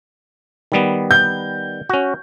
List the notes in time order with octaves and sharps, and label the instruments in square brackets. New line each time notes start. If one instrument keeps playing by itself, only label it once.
[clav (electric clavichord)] D#3 G3 B3
[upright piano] G6
[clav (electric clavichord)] C#4 F#4